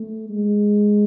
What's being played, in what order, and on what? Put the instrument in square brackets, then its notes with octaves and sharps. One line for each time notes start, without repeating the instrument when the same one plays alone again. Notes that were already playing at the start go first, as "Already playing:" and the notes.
Already playing: [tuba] A3
G#3